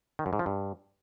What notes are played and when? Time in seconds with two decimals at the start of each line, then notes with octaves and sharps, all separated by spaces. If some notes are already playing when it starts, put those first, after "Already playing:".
0.19 D#3
0.26 F#2
0.33 G#2
0.39 F3
0.46 G2